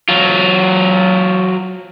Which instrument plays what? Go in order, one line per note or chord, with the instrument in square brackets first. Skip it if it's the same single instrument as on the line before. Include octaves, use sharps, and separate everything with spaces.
[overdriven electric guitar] F#3 F4